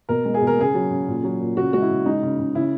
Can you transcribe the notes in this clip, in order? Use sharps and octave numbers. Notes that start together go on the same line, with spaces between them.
B2 A#4
G#3
G#4
B2
A#4
C#3 G#4
F#3
C#3
A#2
F#3
A#2
C#3 F#4
G#3 F#4
E4
C#3
G#3 D#4
C#3
C#3
C#3 E4